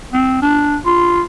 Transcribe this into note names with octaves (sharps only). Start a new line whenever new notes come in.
C4
D4
F4